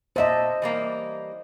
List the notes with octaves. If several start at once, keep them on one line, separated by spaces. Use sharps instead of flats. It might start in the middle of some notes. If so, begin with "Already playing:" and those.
A#2 C5 D#5 E5 A5
E3 G3 A#3